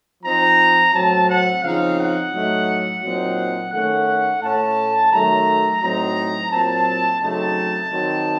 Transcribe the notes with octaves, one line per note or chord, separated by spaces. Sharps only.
F3 C4 D#4 A#5
A2 F#3 C4 A5
F#5
C#3 F3 C4 D#4 F5
F#5
A2 F#3 A3 D#4
A#2 F#3 C4 D#4
D#3 A3 C#4 F#5
A2 A3 C#4 A5
D#3 F#3 A3 A#5
A2 F#3 C4 D#4 A#5
A#2 F#3 C4 A5
C#3 F#3 A3 C4 D#4 A5
D#3 F#3 C4